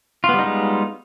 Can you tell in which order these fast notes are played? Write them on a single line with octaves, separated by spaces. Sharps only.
F4 B3 G3 D#4 G#3